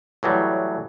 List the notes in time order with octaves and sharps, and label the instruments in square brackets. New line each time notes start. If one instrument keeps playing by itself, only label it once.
[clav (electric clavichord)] A2 E3 F#3 G3